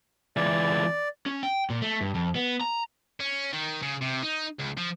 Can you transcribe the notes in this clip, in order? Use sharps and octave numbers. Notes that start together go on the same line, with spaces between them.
C#2 E3 D5
C#4
G5
A#2
A3
G2
F2
B3
A#5
C#4
D#3
C#3
C3
D#4
C#2
F3